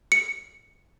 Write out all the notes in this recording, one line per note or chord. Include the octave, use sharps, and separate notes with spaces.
C#7